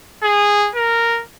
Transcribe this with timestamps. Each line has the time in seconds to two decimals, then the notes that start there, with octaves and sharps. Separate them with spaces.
0.23 G#4
0.75 A#4